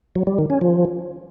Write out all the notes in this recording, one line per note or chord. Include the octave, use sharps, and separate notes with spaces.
F#3
G3
D#3
C#4
F3